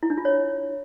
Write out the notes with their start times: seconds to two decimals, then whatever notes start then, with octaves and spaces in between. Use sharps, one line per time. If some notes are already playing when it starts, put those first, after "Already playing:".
0.03 E4
0.10 D4
0.18 F4
0.25 C#5